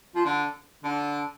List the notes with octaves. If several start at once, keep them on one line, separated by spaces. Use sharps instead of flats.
F3
D3
D3